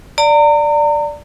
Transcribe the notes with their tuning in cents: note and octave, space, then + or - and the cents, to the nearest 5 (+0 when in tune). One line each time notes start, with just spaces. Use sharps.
D5 +0 A#5 -35